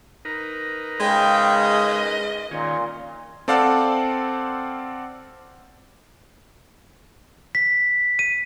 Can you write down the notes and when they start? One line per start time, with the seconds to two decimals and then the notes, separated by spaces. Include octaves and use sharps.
0.25 D#4 A#4 B4
1.00 C#3 G#3 G5
1.59 D#5
2.51 A#2 D#3 C#4
3.48 C4 A4 D5 F5 F#5 A5
7.55 B6
8.19 D#7